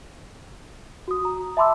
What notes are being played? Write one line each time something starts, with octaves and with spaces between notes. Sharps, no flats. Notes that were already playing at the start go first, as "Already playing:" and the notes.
F#4 D#6
A#5
E5 A5 B5 C6 D6 E6